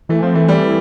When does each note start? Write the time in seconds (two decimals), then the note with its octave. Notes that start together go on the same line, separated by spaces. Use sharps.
0.09 E3 A3
0.22 F3 C4
0.34 E3 A3
0.48 G3